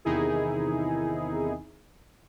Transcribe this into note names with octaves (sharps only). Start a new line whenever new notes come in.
E2 C3 D#3 D#4 E4 G#4